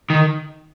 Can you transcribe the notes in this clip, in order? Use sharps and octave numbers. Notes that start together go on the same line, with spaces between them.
D#3